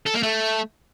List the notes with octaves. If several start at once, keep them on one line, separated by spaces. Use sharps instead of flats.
A4
A#3
A3